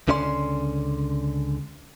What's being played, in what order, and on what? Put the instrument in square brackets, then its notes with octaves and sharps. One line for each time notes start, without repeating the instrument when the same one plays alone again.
[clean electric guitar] C#2 D3 C#4 E4 D5 C6